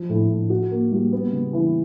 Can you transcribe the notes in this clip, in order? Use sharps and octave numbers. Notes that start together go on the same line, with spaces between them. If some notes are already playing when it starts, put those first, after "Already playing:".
Already playing: F3
A2
A2
F#4
A#3
G3
B3
C#3
E3